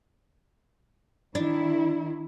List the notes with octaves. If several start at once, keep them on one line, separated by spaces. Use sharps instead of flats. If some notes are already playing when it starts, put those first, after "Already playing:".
D#3 D4 E4